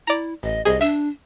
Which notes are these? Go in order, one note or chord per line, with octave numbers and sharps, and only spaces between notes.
E4 D5 A#5
A1 D#5
C2 G#4 D#5
D4 E5 E6 E7